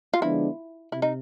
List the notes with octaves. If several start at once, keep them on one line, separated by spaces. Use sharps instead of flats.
F4
D3 F3 G#3 B3 D4 E4
C3 E4
D#4